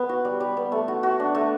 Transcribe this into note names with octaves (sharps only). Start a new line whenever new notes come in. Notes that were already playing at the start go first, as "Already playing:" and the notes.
Already playing: B3
F#4
G3
G3
B3
A3
F#4
F#4
D4
A3